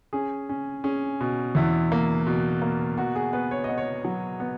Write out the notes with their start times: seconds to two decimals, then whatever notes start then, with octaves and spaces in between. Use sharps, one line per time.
0.13 C#4 G#4
0.49 C#4
0.84 C#4 G#4
1.20 B2
1.55 E2 E4
1.92 A#3
2.27 B2
2.62 A#3
2.98 B2 F#4
3.16 G#4
3.33 B3 B4
3.51 C#5
3.64 D#5
3.69 B3
3.78 C#5
4.05 F#3
4.40 B3